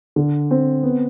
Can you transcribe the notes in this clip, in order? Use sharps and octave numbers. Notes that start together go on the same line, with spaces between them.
D3
C4
B3